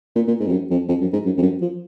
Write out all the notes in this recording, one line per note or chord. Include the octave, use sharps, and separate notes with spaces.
A#2
A#2
G#2
F2
F#2
F2
F2
F#2
G#2
F#2
F2
F#2
F3